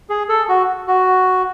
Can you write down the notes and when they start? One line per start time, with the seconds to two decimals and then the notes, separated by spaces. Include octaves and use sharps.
0.10 G#4
0.29 A4
0.49 F#4
0.87 F#4